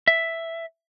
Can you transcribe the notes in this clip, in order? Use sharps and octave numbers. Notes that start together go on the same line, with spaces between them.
E5